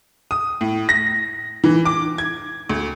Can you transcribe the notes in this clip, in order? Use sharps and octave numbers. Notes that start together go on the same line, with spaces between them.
D#6
A2
A#6
E3
D6
G#6
D2